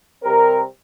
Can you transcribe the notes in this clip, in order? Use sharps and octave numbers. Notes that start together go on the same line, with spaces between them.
C3 G3 C4 A#4